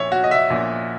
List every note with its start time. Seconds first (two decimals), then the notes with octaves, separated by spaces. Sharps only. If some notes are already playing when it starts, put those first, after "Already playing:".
Already playing: A#1 A#2 C#5 E5
0.12 F#4
0.24 D#5
0.31 E5
0.50 A#1 A#2